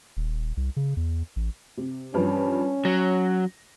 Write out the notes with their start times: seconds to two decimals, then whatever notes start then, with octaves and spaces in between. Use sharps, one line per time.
0.17 D#1
0.57 C2
0.76 C#3
0.97 E2
1.36 A1
1.77 C3
2.14 G2 E3 F3 C#4
2.85 F#3 A#6